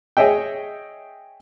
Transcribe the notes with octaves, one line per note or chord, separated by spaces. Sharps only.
G#4 C#5 D#5 E5 G5